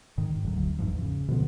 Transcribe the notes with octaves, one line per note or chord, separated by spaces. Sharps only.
G#2 D#3
F#1 D2 F#3
G1 E2 G#2 F3
C#3
B2 D3 F3 B3